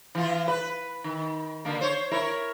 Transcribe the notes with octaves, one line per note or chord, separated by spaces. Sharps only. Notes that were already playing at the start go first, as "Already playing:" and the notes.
E3 F4
B4
D#3
B2 D3 A#3
C5 C#5
E4 A#4 C#5